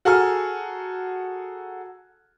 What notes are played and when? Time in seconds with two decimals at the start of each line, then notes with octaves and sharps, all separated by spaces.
0.05 F#4 G#4 A4 A#5 F6